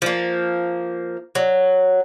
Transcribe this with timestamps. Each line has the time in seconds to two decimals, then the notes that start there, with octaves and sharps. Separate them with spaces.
0.02 F3 A#3
1.35 F#3